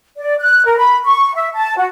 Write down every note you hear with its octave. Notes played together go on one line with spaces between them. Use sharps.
D5
F#6
A#4
B5
C#6
E5
A5
F#4